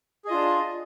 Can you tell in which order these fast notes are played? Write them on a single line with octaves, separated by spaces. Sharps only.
G#4 D#5 F4 D4